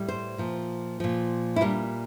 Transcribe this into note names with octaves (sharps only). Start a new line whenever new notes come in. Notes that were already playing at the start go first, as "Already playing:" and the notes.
Already playing: A2 G3
C5
A#2 F3
A#2 F3
E4
A#2 G3 D4